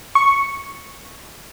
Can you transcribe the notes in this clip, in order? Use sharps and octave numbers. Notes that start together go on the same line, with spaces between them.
C#6